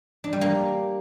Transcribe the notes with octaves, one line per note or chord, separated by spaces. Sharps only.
D4
G3
A#3